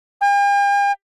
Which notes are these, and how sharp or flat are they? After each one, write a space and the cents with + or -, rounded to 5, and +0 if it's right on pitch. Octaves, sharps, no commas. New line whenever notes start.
G5 +45